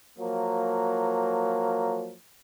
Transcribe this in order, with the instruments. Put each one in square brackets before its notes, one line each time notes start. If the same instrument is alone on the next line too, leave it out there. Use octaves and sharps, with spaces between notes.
[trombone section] F3 F#3 A#3